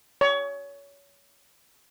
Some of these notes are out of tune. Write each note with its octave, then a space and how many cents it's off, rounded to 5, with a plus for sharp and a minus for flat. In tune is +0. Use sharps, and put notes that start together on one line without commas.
C#5 +25